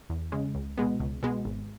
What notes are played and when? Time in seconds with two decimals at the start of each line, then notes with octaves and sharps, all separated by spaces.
0.10 E2
0.32 C#3 G#3 C#4
0.55 C#2
0.78 B2 G#3 B3
1.00 C#2
1.23 B2 G#3 B3
1.45 G#1